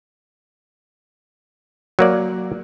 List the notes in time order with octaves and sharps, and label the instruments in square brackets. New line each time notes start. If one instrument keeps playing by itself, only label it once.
[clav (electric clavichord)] F#3 A#3 D5